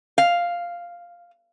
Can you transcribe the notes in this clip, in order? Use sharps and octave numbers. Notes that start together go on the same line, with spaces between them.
F5